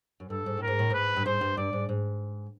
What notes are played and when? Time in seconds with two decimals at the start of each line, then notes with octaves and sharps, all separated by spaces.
0.20 F#2
0.30 G2 A4
0.46 G#2
0.57 A2 A#4
0.67 G#2
0.79 A2
0.90 G#2 B4
1.16 G2
1.25 G#2 C5
1.41 G2
1.57 G2 D5
1.73 G#2
1.89 G#2